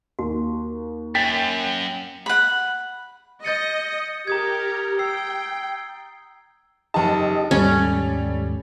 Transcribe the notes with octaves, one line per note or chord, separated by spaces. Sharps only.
D#2 F#4
F#2 G5 A6 B6
F#5 B5
D#5 G6 A6 C#7
G4 A#4 A#5 D#6 G#6
G5 E6 C7
F#1 D#4 G4 D#5 A5
D#2 G#2 G3 C#4 A4 C#5